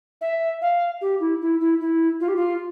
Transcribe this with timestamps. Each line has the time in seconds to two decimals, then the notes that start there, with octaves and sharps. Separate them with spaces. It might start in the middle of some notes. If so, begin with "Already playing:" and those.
0.21 E5
0.62 F5
1.01 G4
1.20 E4
1.41 E4
1.60 E4
1.80 E4
2.20 F4
2.28 G4
2.36 F4